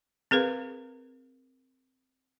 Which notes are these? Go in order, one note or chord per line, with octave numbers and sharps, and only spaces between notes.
C4 G#4 A#4 B4 F5